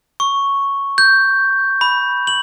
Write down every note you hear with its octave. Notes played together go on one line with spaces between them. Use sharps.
C#6
G6
B5
F#7